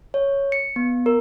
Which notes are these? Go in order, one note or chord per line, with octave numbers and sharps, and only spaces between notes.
C#5
C#7
B3
A#4